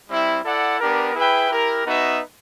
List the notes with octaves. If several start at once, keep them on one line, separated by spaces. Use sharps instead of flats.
G3 C4 E4
E4 A4 D5 F#5
B3 D4 G4 A#4
E4 G#4 B4 E5 G5
E4 G4 A#4
B3 D#4 F#4 B4 E5